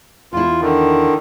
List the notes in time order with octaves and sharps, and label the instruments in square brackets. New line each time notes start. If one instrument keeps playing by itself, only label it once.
[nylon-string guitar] E2 E4 [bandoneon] F4
[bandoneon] D3 D#3